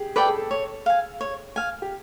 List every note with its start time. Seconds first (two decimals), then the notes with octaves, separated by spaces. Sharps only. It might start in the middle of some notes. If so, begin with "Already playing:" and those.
Already playing: G4 G#4
0.16 A4 B4 D5 G5
0.26 G#4
0.37 A4
0.51 C#5
0.86 F5 G#5
1.21 C#5
1.56 F5 G#5
1.82 G4